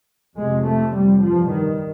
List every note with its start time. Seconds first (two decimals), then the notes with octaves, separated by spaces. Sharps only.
0.36 F2 C3 G#3
0.64 A3
0.94 G3
1.21 G2 F3
1.49 D#3